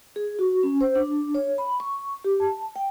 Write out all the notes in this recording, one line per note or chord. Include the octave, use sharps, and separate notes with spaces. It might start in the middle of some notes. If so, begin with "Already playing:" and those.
G#4
F#4
C#4
C5
D4
C#5
B5
C#6
G4
A5
G5